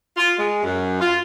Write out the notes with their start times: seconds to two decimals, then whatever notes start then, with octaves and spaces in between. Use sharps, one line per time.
0.17 F4
0.39 G#3
0.63 F#2
1.01 F4